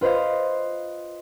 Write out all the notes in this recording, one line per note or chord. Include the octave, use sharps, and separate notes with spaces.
F4 B4 C5 D#5 F5